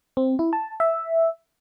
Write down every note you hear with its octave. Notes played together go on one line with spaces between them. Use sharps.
C4
E4
A5
E5